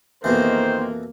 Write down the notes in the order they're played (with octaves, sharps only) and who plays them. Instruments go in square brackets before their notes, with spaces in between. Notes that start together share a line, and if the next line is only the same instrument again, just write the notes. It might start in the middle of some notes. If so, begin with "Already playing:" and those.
[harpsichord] F2 B2 E3 [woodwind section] D#3 C5 [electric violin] A#3